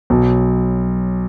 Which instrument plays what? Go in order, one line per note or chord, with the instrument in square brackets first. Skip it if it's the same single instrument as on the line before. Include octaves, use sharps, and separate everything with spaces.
[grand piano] B1 B2 F#3